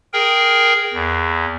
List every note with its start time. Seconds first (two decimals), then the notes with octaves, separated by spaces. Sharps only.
0.13 G#4 A#4 G5
0.93 E2